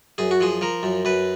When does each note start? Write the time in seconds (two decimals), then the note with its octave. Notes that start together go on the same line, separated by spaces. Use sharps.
0.18 F#2 G#4
0.31 F#4
0.41 F3 G#4
0.61 F3 A#4
0.83 F#2
1.05 F#2 B4